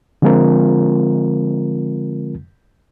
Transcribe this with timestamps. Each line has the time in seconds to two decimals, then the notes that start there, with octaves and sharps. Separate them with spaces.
0.22 D3 F3 G#3 C4 F4 A#4